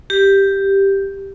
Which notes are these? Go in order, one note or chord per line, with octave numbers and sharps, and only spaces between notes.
G4